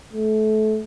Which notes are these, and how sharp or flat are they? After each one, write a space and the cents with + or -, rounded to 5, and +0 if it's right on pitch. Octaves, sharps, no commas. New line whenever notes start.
A3 -25